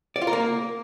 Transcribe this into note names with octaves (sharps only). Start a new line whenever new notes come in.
D5
F4
A#4
A#3